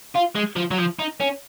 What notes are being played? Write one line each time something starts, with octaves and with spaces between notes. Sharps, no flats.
F4
G#3
F3
F#3
F3
D#4
C#4